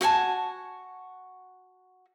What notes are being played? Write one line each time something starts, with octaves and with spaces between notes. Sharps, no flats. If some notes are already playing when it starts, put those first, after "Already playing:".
F#4 F#5 G#5 A5